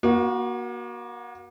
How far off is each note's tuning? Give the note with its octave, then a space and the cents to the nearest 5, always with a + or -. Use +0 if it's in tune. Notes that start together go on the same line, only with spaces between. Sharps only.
A#3 +35 F#4 +0